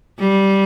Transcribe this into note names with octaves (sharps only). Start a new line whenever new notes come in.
G3